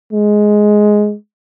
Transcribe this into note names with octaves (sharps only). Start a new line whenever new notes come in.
G#3